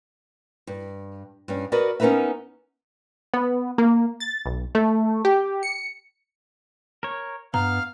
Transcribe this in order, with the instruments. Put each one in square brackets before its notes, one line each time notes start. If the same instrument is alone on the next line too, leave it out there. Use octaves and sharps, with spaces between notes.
[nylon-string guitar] G2
G2 C#4
F#4 A#4 B4 D5 D#5
B3 C#4 D#4 A#4 B4 E5
[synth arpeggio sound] B3
A#3
A6
B1
A3
G4
C#7
[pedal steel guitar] A#4 C#5
[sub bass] G2 [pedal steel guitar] B3 [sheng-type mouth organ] F5 F6 [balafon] A#5